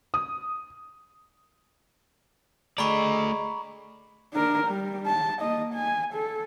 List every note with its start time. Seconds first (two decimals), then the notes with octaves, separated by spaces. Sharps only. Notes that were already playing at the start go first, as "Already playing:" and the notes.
0.14 D#6
2.78 A3 G#4 D5 D#5 A#5 B5 C#6
4.34 D4 A#4
4.67 G3
5.06 A5
5.40 A#3 D#5
5.74 G#5
6.14 A4